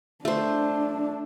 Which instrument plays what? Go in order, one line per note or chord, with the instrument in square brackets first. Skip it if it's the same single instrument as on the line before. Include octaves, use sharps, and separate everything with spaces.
[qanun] A3 C5 [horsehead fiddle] D4